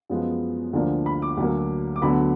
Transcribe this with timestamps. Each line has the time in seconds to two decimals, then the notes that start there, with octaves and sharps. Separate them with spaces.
0.10 F#2 F3 G#3 B3
0.73 D2 D3 F3 A#3 D4
1.06 B5
1.22 D6
1.37 D2 D3 F#3 A#3
1.96 D6
2.01 D2 D3 F#3 B3 B5